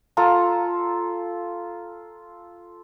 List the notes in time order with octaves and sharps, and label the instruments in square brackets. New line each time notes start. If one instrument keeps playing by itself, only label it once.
[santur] F4 A4 A#5